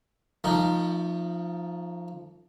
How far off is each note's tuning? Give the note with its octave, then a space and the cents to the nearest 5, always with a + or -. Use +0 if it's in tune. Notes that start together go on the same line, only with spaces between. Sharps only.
F3 +0 A3 +45 D#4 +0